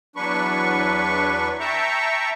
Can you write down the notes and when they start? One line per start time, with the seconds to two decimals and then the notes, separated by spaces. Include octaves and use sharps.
0.16 E2 F#3 D4 B4 C#6
1.60 E5 G5 A5 A#5 C#6